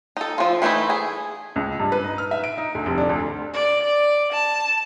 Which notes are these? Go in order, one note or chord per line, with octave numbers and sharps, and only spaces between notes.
D#4 A4
F3 F4
E3 A3 B3 D#4 E4
G#4
C#2
G2
B4
D#4
F6
E5
D7
D#4
D2
F1
D4
D2
D5
D5
A5